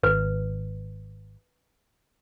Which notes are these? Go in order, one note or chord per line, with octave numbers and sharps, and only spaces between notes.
G#1 B4